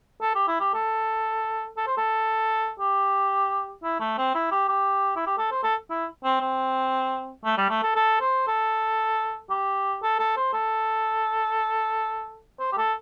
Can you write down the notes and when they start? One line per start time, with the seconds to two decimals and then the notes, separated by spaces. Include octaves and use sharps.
0.22 A4
0.35 G4
0.48 E4
0.60 G4
0.74 A4
1.77 A4
1.87 C5
1.98 A4
2.80 G4
3.84 E4
4.00 A3
4.18 C4
4.35 E4
4.52 G4
4.69 G4
5.16 E4
5.27 G4
5.38 A4
5.51 C5
5.64 A4
5.90 E4
6.24 C4
6.41 C4
7.45 A3
7.58 G3
7.70 A3
7.83 A4
7.96 A4
8.21 C5
8.48 A4
9.50 G4
10.03 A4
10.19 A4
10.37 C5
10.53 A4
12.60 C5
12.73 G4
12.78 A4